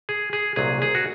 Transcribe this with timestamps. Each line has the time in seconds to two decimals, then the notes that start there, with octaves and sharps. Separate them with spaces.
0.09 G#4
0.33 G#4
0.56 C2 A#2 F#3 G#4
0.82 G#4
0.95 F#4